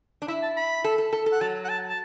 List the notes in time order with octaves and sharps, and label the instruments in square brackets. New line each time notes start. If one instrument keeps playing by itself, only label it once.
[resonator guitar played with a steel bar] D4
[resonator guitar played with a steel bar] E4 [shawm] E5
[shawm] A5
B5
[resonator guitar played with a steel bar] A4
A4
A4
A4
[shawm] F#5
[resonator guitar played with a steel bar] F#3 [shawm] A5
[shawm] F#5
A5
A5